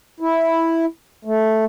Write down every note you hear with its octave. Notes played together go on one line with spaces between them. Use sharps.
E4
A3